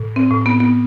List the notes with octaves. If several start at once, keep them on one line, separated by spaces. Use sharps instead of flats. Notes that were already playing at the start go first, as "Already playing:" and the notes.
Already playing: A2
C4
A2
B3
B3